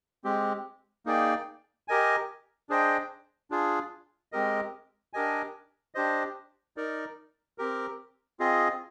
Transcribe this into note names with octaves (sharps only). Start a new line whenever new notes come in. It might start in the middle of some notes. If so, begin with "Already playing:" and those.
G#3 C4 G4
A#3 D#4 G#4 D5 G5
G4 A#4 D#5 G#5
D4 G#4 C5 D#5 G5
D4 F4 G#4
G#3 C4 G4 A#4 D#5
D4 G4 A#4 D#5 G#5
D4 G4 C5 D#5
D#4 A#4 D5
C4 G4 A#4
C4 F4 G#4 D#5